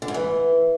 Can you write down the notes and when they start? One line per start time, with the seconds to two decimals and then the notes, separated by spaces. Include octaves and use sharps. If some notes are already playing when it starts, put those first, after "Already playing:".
0.02 D3
0.08 G#2
0.14 E3